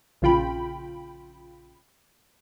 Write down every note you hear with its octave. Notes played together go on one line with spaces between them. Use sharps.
A#1 C#3 F4 G5 B5